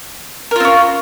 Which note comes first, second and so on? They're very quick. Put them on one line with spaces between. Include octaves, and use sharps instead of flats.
A#4 F4 C4 C#4